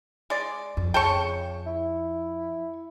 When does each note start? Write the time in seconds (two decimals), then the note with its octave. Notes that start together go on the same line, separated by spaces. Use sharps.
0.30 G#3 D5
0.77 F2
0.94 C#3 G5 A5 C#6
1.66 E4